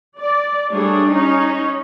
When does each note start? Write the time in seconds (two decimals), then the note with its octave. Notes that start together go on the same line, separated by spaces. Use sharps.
0.20 D5
0.72 G3 A3 D4 G#4 C#5
1.12 C#4 D#4 C#5